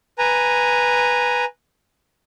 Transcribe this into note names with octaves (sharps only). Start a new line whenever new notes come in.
B4 G#5 A#5